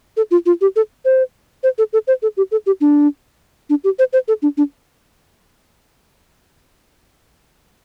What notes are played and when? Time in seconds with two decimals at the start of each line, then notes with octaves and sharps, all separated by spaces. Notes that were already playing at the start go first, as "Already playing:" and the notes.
0.17 A4
0.31 F4
0.46 F4
0.61 G4
0.76 A4
1.05 C5
1.63 C5
1.78 A4
1.93 A4
2.08 C5
2.22 A4
2.37 G4
2.52 A4
2.66 G4
2.81 D4
3.70 D4
3.84 G4
3.99 C5
4.13 C5
4.28 A4
4.42 D4
4.57 D4